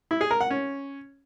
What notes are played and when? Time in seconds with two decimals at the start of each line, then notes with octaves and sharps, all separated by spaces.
0.11 E4
0.21 G#4
0.31 A#4
0.41 F#5
0.50 C#4